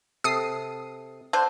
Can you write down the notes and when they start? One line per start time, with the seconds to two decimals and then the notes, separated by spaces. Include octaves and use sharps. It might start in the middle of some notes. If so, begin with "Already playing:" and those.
0.24 C3 A4 D#6 C7
1.33 D3 A4 C5